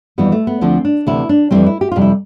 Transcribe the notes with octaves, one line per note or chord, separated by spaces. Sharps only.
F2 E3 G3 B3
A3
B3
D2 D3 F3 C4
D4
D2 C3 E3 E4
D4
F2 E3 G3 C4
E4
G4
F2 C3 G3 F4
E4